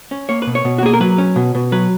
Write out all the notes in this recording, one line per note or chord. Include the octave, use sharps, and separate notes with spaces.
C#4
A#3 C#5
B2 B4
C#5
B2
F#4
A#3 G#4
A#4
F#3 B4
C#4
B2
B2
F#3 B4